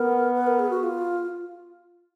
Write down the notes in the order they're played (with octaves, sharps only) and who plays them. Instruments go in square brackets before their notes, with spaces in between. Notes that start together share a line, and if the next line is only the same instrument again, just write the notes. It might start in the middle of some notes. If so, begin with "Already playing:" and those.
Already playing: [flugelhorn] B3 [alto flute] A#4
[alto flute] B4
A#4
G#4
F#4
F4